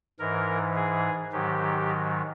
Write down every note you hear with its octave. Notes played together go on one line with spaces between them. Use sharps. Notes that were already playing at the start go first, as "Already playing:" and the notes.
G#2 E3 A#4
G#4
G#2 D#3 F#3 G4